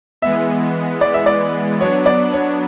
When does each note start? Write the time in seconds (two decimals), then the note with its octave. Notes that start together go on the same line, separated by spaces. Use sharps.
0.22 E3 G#3 B3 E5
1.01 D5
1.14 E5
1.26 D5
1.80 F#3 B3 D4 C#5
2.06 D5
2.33 C#5